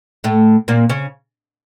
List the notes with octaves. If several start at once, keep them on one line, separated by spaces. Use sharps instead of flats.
A2 A3
A#2 A#3
C#3 C#4